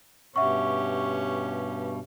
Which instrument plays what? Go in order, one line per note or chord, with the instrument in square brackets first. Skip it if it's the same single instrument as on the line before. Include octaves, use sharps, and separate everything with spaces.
[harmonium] G2 B2 [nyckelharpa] C#4 G4 [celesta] E5 F#5 C#6